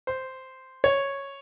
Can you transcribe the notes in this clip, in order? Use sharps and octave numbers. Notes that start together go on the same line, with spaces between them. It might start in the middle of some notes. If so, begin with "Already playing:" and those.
C5
C#5